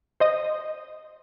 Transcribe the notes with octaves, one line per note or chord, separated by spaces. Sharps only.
C5 D#5 D#6